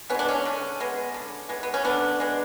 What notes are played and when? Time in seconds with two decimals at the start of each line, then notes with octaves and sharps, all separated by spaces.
0.10 B3 C#4
0.14 G#3 D4
0.28 C#4
0.46 D3
0.80 G#3 B3
1.14 D3
1.49 G#3 B3
1.63 B3
1.74 C#4
1.85 D3 B3 D4
2.20 G#3 B3